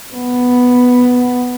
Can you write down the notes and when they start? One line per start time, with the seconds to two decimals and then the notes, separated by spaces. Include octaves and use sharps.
0.14 B3